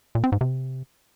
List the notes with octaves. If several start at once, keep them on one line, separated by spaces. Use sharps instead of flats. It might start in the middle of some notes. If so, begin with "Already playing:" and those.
A#2
C4
G#2
C3